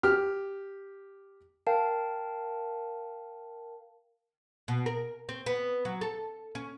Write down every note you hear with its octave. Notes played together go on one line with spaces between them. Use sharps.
G4 F6
A#4 F5 G5 A5
B2
A#4
C4
B3
F#3
A4
C#4